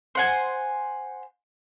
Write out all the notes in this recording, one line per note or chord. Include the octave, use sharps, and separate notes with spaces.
C5 F#5 G#5